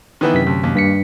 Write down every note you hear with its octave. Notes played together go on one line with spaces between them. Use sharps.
D#3 E3 B3
F#2 C3 B6
D2
D#2
G2 B6 C#7